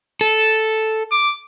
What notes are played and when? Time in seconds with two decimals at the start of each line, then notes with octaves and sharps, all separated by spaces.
0.21 A4
1.12 D6